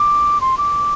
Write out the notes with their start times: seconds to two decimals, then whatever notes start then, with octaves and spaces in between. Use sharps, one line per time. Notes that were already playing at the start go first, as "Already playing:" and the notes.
Already playing: D6
0.41 C6
0.58 D6